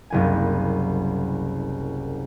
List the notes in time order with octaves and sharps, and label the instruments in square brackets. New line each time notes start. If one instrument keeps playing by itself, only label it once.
[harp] F#1 C2 G#5